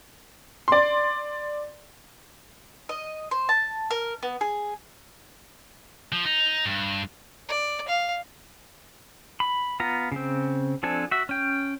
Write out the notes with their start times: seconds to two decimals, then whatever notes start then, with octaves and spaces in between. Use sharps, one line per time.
0.68 D5 C6
2.89 D#5
3.31 C5
3.49 A5
3.91 A#4
4.23 B3
4.41 G#4
6.12 F3
6.25 D#4
6.66 G2
7.49 D5
7.88 F5
9.40 B5
9.80 B3 F4 A#5
10.12 C#3 C4
10.83 F3 C4 D4 A4 G#5
11.11 F#4 E5
11.29 C#4 G5